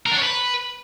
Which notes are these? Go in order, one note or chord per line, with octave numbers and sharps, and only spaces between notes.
A#4
D4
C#5
B4